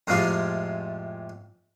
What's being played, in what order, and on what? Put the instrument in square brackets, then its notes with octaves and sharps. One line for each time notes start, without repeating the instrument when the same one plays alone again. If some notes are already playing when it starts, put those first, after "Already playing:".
[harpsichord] F2 A2 C3 F3 G#3 F4